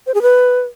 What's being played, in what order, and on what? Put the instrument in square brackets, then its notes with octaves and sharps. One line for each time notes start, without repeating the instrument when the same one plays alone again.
[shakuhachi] C5
G#4
B4